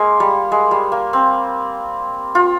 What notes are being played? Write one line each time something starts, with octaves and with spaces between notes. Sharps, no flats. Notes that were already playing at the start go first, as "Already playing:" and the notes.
Already playing: G#3 A#3
G3
G#3
G3
A#3
C4
F4